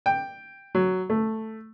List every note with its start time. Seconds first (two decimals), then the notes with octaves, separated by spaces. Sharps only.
0.06 G5
0.75 F#3
1.10 A3